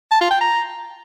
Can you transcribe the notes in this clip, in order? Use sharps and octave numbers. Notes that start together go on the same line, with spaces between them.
A5
F4
G5
A#5